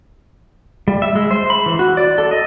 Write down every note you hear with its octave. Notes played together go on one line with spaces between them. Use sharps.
G3
E5
G#3
C5
B5
E3
F#4
D5
A4
D#5